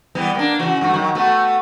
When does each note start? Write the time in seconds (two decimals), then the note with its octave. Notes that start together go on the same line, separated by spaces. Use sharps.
0.15 E3 G3 B3
0.35 A#3 D4
0.59 C#3 E3 F#4
0.81 G2 A3 F#4
0.94 D#3 F#3
1.15 A3 B3 F#4